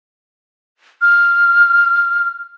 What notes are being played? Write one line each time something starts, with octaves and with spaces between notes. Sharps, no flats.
F6